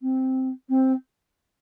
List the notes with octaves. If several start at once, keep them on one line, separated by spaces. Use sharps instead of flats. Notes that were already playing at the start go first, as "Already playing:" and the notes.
C4
C4